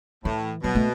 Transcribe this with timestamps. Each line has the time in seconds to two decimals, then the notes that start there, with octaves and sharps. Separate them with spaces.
0.24 A2 E3
0.63 B2 F#3
0.75 A3